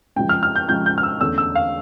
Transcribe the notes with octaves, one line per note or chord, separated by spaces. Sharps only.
C#2 C#3 F3 G5
F6
F6
G6
C#2 C#3 F3 G6
G6
F6
E6
E2 D3 A3 C#4 E6
E6
F5